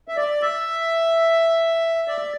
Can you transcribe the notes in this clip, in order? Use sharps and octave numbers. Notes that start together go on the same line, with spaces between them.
E5
D5
E5
D5